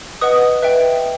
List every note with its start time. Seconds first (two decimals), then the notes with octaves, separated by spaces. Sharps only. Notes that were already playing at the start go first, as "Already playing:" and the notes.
0.21 B4 D#5 F#5 D#6
0.63 B4 E5 G5